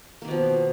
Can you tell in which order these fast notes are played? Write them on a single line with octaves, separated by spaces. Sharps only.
A#3 D#3 B2 F3